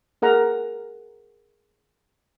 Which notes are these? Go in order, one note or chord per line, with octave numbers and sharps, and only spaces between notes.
G#4 A#4 F#5 A#5